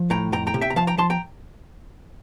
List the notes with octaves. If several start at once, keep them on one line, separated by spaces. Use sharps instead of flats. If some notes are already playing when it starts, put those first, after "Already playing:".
Already playing: F3
A2 G5 A#5
F2 G5 A#5
G5 A#5
C3
E5 G5
A#5
F3 F5 A5
G5 A#5
F3 A5 C6
G5 A#5